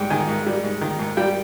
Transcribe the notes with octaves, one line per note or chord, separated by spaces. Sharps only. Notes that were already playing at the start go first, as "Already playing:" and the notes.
Already playing: G#2 G3 G5
D#3 G#5
G#2
G3
G#2
D#3
G#2
G3 G5